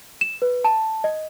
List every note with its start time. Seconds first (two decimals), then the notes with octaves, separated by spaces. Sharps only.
0.21 E7
0.42 B4
0.65 A5
1.04 D#5